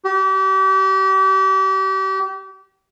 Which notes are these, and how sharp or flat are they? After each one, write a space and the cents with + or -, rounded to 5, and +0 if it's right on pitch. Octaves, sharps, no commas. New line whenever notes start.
G4 -35